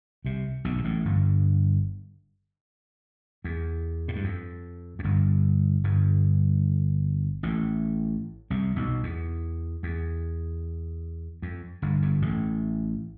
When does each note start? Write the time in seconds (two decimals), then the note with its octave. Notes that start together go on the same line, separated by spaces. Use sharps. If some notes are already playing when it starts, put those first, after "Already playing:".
0.25 C2 C3
0.65 B1 B2
0.78 G2
0.84 A1 A2
1.05 G1 G2
3.44 E2
4.08 A2
4.16 G2
4.24 F2
4.99 F2
5.04 G1 G2
5.84 G1 G2
7.43 A1 A2
8.50 C2 C3
8.76 B1 B2
9.03 E2
9.83 E2
11.42 F2
11.82 G1 G2
12.02 G1 G2
12.22 A1 A2